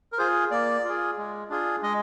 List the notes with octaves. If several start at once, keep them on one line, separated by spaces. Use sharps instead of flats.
A#4
F4 G#4 C5
A#3 D5
F4 G#4
G#3
D4 F4 G#4
G#3 D#5